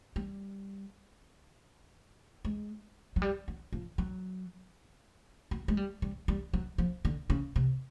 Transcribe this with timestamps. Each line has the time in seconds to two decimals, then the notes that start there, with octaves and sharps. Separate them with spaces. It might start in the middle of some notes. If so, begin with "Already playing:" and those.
0.16 G3
2.45 G#3
3.16 F#3
3.22 G3
3.48 F#3
3.73 F3
3.98 F#3
5.51 F#3
5.68 G#3
5.77 G3
6.02 G3
6.28 G3
6.53 F#3
6.78 F3
7.05 D3
7.30 C#3
7.56 C3